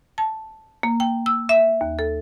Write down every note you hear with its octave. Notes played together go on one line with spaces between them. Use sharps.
A5
A#3
G5
E6
E5
D#2
A4